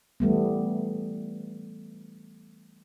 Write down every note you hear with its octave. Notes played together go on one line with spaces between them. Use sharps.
E3 G3 A3 B3